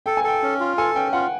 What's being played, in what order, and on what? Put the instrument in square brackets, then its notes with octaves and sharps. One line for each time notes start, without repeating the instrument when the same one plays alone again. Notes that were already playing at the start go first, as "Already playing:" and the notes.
[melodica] A4 [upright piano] G5
[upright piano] G#5
[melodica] A4 [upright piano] G5
[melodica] C#4
F4
[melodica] A4 [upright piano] G#5
[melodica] C#4 [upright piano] G5
[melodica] F4 [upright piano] F#5